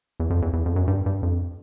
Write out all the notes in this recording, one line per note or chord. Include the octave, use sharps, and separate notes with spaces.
E2
F2
E2
E2
F2
F#2
G2
G2
F2